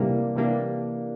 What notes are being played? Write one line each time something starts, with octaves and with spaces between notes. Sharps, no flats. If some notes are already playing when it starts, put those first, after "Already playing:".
Already playing: C3 E3 G3 A#3 D4
C3 E3 G3 A#3 D4